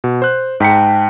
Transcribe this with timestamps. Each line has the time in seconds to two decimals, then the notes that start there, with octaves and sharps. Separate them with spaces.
0.04 B2
0.22 C5 F#6
0.60 G#2 G5 A5 A#5 B6 C#7